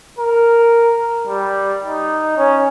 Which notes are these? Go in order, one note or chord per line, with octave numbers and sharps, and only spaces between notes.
A#4
G3
D#4
C#4